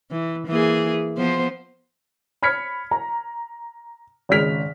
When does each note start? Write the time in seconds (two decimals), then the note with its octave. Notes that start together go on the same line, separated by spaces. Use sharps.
0.11 E3
0.47 E3 A#3 G#4
1.17 F3 B3 C5
2.43 B5 F6 G#6 B6 C#7
2.91 A#5
4.29 G#1 C#3 G#3 F6 B6 F7